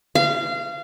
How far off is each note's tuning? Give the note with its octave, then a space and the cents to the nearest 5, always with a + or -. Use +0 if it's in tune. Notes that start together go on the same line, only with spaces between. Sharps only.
F5 -25